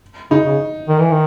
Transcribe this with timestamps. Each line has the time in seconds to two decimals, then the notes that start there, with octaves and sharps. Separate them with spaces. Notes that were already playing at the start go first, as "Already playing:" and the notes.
0.31 C#3 D#4
0.45 C#3
0.88 D#3
1.00 E3
1.11 D#3